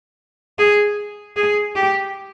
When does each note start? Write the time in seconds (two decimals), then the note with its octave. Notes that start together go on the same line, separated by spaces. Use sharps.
0.59 G#4
1.36 G#4
1.75 G4